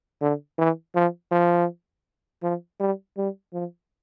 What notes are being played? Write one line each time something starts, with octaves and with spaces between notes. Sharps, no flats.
D3
E3
F3
F3
F3
G3
G3
F3